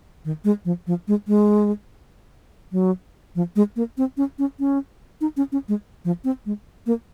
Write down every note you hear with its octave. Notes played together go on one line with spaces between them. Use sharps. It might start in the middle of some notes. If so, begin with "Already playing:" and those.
D#3
G#3
F3
F3
G#3
G#3
F#3
F3
G#3
A#3
C4
C#4
C#4
C#4
D#4
C#4
C#4
G#3
F3
C4
G#3
A#3